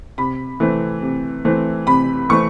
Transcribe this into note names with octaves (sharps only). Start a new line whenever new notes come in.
C3 B5
E3 A3 C4
C3
E3 A3 C4
C3 B5
E3 A3 C4 C#6